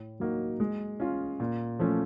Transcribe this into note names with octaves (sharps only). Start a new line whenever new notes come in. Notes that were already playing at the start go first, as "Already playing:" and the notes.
Already playing: A2
F#3 A#3 D#4 F#4
G#3
C#4 F4
A#2
F3 A3 C#4